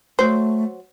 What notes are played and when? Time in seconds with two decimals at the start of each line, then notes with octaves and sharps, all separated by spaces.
0.19 F#3 A3 C5